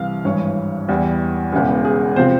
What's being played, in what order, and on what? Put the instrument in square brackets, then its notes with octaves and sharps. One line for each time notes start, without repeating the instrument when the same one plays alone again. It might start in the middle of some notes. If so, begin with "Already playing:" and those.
Already playing: [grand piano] C2 C3 E3 F5
G#1 G2 E3 C#5
E2 E3 G3
E1 E2 C#3 E3
G#4
C3 F3 C4 C5